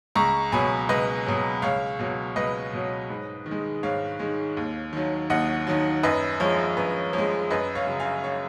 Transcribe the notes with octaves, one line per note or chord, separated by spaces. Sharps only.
C#2 A#5 C#6
B2 F#3 G#5 B5
C#2 B4 D#5
B2 F#3
C#2 C#5 F5
B2 F#3
C#2 B4 D#5
B2 F#3
G#2
D#3
G#3
G#2 C#5 F5
D#3 G#3
D#2
D#3 F#3
D#2 D#5 F#5
D#3 F#3
F#2 B4 D#5
F3 G#3 C#5
F#2 B4
F3 C#5
G#3
F#2 B4 D#5
C#5 F5
C#3 F#3
F5 G#5
C#5 F5